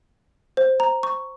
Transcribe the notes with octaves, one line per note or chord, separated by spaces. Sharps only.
C5
A#5
C#6